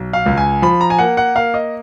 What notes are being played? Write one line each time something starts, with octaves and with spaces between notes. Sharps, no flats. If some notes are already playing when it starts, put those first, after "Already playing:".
Already playing: B1
F5
C#2
G#5
F3 B5
A#5
G#5
A#3 F#5
F#5
A#3 F5
D#5